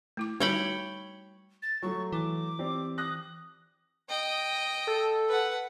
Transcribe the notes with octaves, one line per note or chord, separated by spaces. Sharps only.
A3 E4 D6
G3 D#4 F#4 C#5 G5 B5
A6
F#3 A3 C#6
E3 D6
C4 G4 D5
D#6 F#6 A#6
D#5 G5
A4
B4 F#5